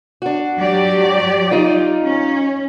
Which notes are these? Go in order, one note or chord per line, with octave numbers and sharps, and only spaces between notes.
D4 F#4
F#3 G4 D5
D#4 F4
C#4